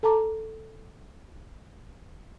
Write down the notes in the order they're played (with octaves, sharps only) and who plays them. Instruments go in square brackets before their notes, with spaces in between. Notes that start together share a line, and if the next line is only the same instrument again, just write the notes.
[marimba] A4 A5 A#5 D6